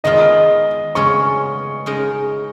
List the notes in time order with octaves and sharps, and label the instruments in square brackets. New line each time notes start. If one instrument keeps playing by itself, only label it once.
[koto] D#3 G#3 B3 F4 [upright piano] D#5
[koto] C#3 G#3 C#4 F4 [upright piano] C#6
[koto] C#3 G#3 D#4 A#4